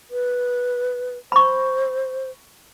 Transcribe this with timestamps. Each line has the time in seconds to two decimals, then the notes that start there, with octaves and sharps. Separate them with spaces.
0.11 B4
1.32 C5 B5 C#6